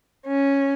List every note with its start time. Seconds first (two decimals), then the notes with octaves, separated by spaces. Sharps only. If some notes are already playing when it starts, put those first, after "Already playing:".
0.25 C#4